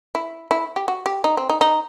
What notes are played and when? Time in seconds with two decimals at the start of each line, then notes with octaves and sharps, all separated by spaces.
0.15 E4
0.51 E4
0.76 G4
0.88 F#4
1.06 G4
1.24 D#4
1.37 C4
1.49 D#4
1.61 D#4